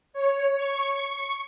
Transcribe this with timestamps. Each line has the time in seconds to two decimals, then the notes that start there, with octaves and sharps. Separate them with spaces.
0.13 C#5
0.57 C#6
0.89 C#6